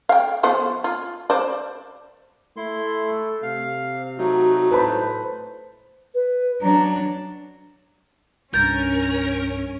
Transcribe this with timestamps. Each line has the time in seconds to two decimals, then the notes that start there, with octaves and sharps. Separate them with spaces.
0.09 F5 G5
0.43 F3 B3 C5
0.84 F4
1.30 C5 D5
2.57 A3 E4 C6
3.43 C3 F5
4.18 F#3 A3 D#4 F#4
4.71 A2 B4 C5 A5 B5
6.14 B4
6.62 F#3 D4 A#5
8.54 C2 G2 C#4 A#4 G6 A6